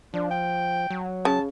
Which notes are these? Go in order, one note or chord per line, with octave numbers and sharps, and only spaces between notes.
F3 D4
G5
F#3
C#3 A5